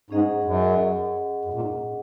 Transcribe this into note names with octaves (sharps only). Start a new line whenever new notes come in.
G#2 C#4 G#4 D#5 F#5
F#2
F#2
A#2
G#2